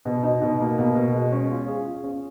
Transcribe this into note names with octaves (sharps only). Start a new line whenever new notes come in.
B2
D#4
B2
A#3
B2
B2
G#3
C#4
F4
G#4
F4
C#4